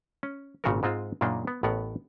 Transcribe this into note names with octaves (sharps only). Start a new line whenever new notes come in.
C#4
G#1 A#2 C#3 F#4 A4 A#4
G#2 G#3 C4 F4 C5
F#2 A#2 C#3 A#3 D4 D#4
B3
A1 A2 B3 A#4 F#5